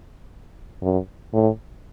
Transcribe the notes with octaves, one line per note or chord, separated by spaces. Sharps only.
F#2
A2